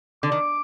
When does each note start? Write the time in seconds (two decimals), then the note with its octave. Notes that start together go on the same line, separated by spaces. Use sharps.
0.23 D3 D6
0.32 D#3